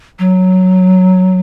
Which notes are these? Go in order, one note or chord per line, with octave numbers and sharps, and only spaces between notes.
F#3